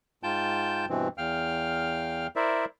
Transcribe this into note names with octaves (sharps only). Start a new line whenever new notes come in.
G#2 F4 G5 A5 G6
G2 B2 E3 C4
E2 F5 G5 F6
E4 A#4 C5 D5 E5